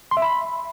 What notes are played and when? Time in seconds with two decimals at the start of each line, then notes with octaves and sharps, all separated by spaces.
0.11 C6
0.17 E5
0.22 B5